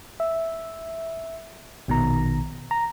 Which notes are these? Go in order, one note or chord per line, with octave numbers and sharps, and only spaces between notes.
E5
A#1 B2 D#3 A#5
A#5